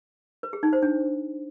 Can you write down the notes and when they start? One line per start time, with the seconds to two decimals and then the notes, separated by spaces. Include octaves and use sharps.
0.43 B4
0.53 G#4
0.63 D#4
0.73 C5
0.82 D4